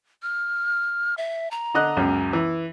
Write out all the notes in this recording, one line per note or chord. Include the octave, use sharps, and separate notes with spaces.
F6
E5
A#5
D3 D#5 F#6
C#2 F#2 C#4
E3